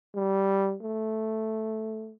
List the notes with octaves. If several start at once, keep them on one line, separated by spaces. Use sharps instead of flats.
G3
A3